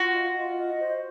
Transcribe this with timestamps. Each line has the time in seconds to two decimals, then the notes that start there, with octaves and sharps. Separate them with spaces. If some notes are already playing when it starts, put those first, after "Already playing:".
Already playing: F4 F#4
0.14 D#5
0.36 F4
0.57 D#5
0.79 C5